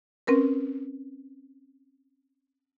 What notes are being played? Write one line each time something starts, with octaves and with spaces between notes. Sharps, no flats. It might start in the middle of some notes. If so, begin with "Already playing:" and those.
C4 C#4 A#4 B4